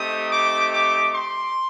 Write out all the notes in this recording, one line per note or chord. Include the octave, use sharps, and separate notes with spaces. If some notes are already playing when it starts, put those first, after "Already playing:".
Already playing: A3 C4 D#4 G4 D#6
D6
D6
C6